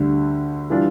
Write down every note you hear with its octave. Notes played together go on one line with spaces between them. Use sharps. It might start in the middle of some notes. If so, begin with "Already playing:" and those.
Already playing: D2 D3 G3 D4
E3 G3 D4 F4